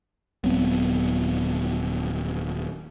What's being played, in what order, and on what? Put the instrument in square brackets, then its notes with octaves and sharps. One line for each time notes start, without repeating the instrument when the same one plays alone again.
[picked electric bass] D#1 F#3 B3 C4